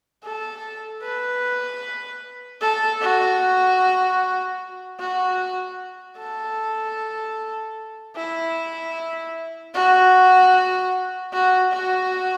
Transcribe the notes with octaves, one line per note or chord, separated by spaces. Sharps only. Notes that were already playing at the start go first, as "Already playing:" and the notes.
A4
B4
A4
F#4
F#4
A4
E4
F#4
F#4
F#4